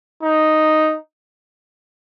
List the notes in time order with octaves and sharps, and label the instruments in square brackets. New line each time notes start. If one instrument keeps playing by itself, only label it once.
[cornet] D#4